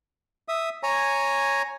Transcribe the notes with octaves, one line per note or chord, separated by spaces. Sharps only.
E5 D#6
C#5 G#5 A#5